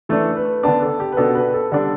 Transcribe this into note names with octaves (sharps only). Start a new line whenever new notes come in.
E3 A3 D4 A4
B4
D3 B3 D4 A5
A4
G4
B4
B2 B3 D4 A4
B4
A4
D3 G3 D4 A4